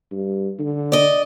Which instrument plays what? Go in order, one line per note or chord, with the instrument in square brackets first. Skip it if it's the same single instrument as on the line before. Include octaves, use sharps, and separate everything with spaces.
[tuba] G2
D3
[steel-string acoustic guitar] D5 D#5